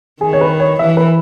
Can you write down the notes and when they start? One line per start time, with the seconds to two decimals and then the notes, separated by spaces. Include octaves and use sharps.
0.21 D#3 G#4
0.33 C#5
0.41 B4
0.60 C#5
0.79 E3 E5
0.97 B4